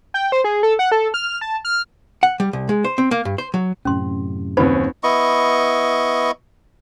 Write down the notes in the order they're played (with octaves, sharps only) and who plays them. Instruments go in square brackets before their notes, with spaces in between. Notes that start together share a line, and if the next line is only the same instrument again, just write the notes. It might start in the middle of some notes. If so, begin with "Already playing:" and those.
[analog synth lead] G5
C5
G#4
A4
F#5
A4
F6
A5
F6
[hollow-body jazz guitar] F#5
G3
C2
G#3
C5
C4
A#3
G2
C5
F#3
[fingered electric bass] F#2 A2 C3 [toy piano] C#4 C6
[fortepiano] D#2 C#4 [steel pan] C4 F#4 B4 [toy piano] D#4 C5 B5
[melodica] B3 E4 D#5 C#6